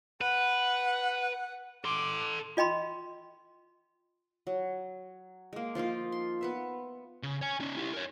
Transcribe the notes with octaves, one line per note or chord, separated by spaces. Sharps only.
B4 F#5
A4 C6 D6
F4 D#5 G5 B5 C6
F#3
G#3 A#3
F3 A#3 D#4 F4
C6
B3 B4 E5
C#3
C#5 G#5
C#4 D#4
E4 G4
A#4 C#5